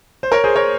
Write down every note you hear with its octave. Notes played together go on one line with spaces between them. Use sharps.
C5
A#4 C#5
G#4 C5
A#4 C#5